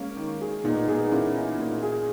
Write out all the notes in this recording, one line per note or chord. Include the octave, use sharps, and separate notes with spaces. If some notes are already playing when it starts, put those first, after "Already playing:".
Already playing: G#3 A#3 C#4
D#3
G#4
A#2 B3 D#4
B3 D#4 G#4
A#3 C#4 E4
D#4
A#2
G#4